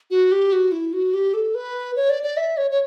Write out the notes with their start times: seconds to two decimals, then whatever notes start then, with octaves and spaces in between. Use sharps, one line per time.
0.11 F#4
0.32 G4
0.53 F#4
0.72 E4
0.93 F#4
1.14 G4
1.34 A4
1.55 B4
1.96 C#5
2.10 D5
2.23 D5
2.37 E5
2.57 C#5
2.71 C#5